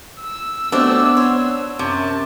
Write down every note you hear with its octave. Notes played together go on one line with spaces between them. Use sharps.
E6
F#3 A3 B3 C4 D4
C5 C#5
F#2 C3 A5